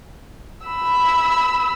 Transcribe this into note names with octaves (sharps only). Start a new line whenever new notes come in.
B5 E6